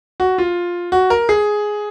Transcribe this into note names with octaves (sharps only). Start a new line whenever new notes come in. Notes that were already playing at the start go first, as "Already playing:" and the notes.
F#4
F4
F#4
A#4
G#4